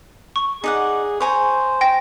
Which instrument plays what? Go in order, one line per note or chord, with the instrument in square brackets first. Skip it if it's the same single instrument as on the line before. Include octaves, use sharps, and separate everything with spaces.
[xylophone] C#6
[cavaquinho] D#4 D5 F#5 [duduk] G#4
[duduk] C5 [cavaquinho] C#5 G#5 A#5
[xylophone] G5 A#6